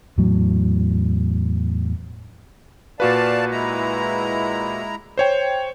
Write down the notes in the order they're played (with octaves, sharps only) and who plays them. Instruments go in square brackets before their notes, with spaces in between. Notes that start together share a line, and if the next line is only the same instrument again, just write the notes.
[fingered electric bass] E2 A2 F#3
[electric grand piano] A#2 F#4 B4 [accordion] D5 F5 A5
[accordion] G#3 E4 A#5
[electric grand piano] C5 C#5 G5